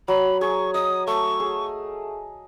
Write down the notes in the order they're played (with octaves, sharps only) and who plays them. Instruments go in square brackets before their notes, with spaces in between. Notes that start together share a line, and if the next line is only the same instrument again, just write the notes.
[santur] F#3 [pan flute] B5
[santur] G#4 [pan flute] C#6
[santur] D#5 [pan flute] D#6
[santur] A3 [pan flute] C#6
[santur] G#4